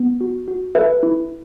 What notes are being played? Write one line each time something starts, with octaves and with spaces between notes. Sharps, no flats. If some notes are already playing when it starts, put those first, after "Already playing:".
Already playing: B3
F#4
F#4
A4 B4 E5
E4